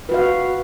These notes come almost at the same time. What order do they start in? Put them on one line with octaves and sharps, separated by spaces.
B4 F#4 F5